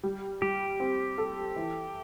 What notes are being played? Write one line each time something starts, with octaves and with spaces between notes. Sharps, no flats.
G3
G3 G4
C4
A4
E3